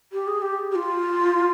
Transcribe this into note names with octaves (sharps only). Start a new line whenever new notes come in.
G4
G#4
G4
G4
F4